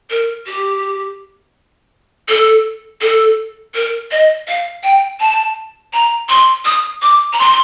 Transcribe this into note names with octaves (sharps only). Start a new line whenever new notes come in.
A#4
G4
A4
A4
A#4
D#5
F5
G5
A5
A#5
C6
D#6
D6
A#5
C6